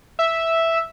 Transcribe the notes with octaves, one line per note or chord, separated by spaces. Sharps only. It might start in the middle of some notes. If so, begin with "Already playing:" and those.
E5